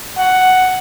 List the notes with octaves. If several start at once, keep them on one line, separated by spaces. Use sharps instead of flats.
F#5